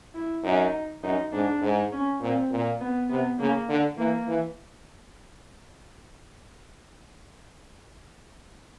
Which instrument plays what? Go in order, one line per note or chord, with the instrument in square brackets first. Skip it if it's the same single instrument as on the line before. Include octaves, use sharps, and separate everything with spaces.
[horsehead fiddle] E4
[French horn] F#2 [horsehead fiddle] D#4
[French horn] F#2 [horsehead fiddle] D#4
[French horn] G#2 [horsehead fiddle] D4
[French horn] G#2
[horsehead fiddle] C#4
[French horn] A#2 [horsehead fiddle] C4
[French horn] A#2
[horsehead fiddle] B3
[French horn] C3 [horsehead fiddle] B3
[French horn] C#3 [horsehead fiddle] A#3
[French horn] D3
[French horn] E3 [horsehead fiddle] A#3
[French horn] E3